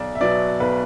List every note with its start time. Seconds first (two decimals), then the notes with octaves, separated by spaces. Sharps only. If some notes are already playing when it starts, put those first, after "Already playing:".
Already playing: B1 D5
0.15 E5
0.21 B2 F#3 B3 D5
0.60 B1 B4